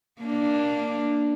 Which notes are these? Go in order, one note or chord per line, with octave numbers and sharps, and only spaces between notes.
A#3 D4